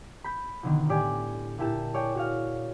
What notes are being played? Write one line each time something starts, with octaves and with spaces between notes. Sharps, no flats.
B5 G6 B6
B1 D3 D#3
A2 G4 D5 G5 G#5
A#2 E4 G4 A5 E7
G#4 C#5 D5 G5
F#4 C#5 F5